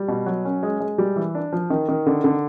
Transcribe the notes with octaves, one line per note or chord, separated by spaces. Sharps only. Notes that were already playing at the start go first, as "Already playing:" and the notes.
Already playing: G3
B2
F#3
C#4
G#3
G#3
G3
E3
D4
F3
D#3
D#3
D3
D3